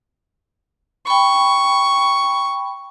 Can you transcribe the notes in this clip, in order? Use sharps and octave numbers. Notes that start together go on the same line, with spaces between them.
G5 B5 C#6